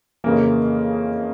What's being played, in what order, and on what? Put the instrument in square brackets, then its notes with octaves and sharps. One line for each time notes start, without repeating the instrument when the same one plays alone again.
[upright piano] F2 C#3 E3 A#3